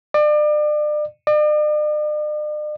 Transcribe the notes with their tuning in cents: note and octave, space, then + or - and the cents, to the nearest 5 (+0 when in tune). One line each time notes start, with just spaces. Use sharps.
D5 +35
D5 +45